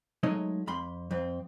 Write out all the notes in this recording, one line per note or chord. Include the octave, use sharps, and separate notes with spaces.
F#3 G#3 A3 D#4 C#5 D#5
F2 B5 C6
F2 C4